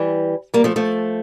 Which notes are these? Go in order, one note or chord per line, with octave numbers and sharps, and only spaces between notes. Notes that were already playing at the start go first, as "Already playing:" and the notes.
Already playing: E3 G3
G3 A#3
F3 A3
F3 A3